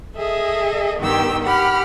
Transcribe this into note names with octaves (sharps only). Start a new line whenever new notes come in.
G#4 A4 D#5 E5
G2 D#3 B3 G4 G5 E6
G4 F#5 B5 F6